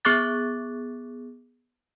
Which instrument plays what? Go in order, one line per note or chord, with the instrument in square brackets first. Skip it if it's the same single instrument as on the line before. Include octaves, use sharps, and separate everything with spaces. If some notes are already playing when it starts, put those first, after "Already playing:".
[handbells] B3 G#4 C#6 D6 F#6 A6